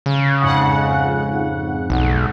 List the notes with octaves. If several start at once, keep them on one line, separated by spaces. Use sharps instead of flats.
C#3
F2 G#2 F#5
B1